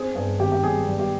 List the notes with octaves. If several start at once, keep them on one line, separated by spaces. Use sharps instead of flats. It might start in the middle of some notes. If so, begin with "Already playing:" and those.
Already playing: C4 G#4 C5
G2 G#4
G#1 G4
G4
G3 G#4
G3
G4